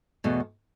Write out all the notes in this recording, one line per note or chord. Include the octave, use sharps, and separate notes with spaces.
E2 B2 A3